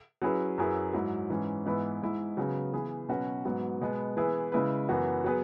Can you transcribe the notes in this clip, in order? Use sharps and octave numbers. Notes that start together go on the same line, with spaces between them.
F#3 C#4 E4 G#4 B4
F#2 F#3 E4 G#4 B4
G#2 F#3 E4
G#2 E3 C#4
G#2 E3 B3 E4 B4
G#2 G#3 E4
C#3 F#3 B3 G#4 B4
E3 B3 G#4 B4
B2 F#3 C#4 F#4 B4
G#2 F#3 B3 F#4
B2 G#3 B3
E3 B3 E4 G#4 B4
C#3 G#3 E4 G#4 B4
F#2 E3 B3 F#4
F#3 B3 G#4 B4